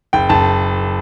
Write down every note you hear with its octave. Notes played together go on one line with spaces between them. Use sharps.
F#1 G5
F#1 A5